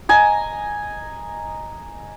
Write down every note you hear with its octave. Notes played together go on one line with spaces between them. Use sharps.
D#5 G#5 A#5